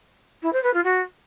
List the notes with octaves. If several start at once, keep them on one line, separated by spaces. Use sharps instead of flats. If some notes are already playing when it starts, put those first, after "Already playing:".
E4
C5
B4
F4
F#4